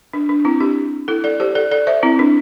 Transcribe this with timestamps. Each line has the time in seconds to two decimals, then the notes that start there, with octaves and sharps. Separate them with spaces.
0.13 D4
0.29 D4
0.45 C4 E4
0.60 D4 G4
1.08 E4 A4
1.24 A4 D5
1.40 G4 C5
1.55 A4 D5
1.71 A4 D5
1.87 C5 E5
2.03 C4 E4
2.19 D4